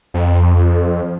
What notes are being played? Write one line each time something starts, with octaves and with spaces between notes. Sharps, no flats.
F2